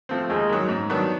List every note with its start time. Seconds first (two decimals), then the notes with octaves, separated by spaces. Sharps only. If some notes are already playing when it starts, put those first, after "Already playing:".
0.09 F3 A3 C4
0.30 D#2 G#3
0.50 D#3 F#3
0.69 G#2
0.90 D#3 F#3 B3 D4